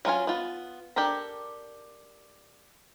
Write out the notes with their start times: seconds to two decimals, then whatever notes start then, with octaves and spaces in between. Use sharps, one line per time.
0.05 F#3 C#4 F4 G#5
0.27 B3 F4
0.96 D4 G4 A4 A#4 A#5